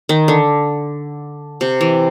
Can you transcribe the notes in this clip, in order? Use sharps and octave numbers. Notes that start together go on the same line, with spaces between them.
D#3
D3
C3
E3